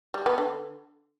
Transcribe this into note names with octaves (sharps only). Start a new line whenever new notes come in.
G3
B3
D3